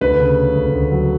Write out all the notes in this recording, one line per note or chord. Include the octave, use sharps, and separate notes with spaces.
D2 B4
C#3
C#4
D2
D2
F#3